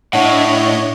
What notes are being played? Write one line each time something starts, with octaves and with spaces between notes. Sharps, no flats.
A2 D4 C#5 D#5 F#5